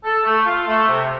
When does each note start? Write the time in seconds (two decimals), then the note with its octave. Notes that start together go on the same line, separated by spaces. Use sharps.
0.04 A4
0.24 A3
0.45 F4
0.66 A3
0.86 C3